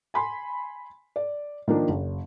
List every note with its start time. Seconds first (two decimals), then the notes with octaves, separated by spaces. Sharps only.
0.14 G#5 B5 C6
1.16 D5
1.68 D#3 F3 A#3 D4
1.89 F#1